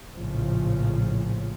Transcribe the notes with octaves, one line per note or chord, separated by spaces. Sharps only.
A#1 A2 C#3 F3